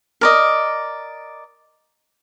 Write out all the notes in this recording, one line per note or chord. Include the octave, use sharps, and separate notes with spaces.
A#4 D5 D#5